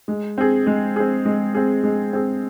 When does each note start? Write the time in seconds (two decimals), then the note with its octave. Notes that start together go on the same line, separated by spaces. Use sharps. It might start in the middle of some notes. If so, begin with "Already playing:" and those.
0.08 G#3
0.38 C4 G#4
0.67 G#3
0.96 C4 G#4
1.25 G#3
1.54 C4 G#4
1.84 G#3
2.13 C4 G#4